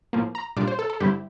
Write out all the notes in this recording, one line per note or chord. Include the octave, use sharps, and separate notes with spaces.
A2 F3 A#3
A#5
A#2 G3 D4 F4 D5
C5
A4
A4
G2 D3 G3 C4 E4 G4